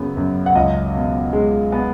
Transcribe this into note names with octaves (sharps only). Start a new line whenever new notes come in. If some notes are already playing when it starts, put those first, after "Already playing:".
Already playing: F#2 C#3 B3
F#2
F#5
C#2 D#5
B2
G#3
B3